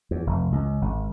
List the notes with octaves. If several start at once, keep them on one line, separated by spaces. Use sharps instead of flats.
E2
F1
C#2
G#1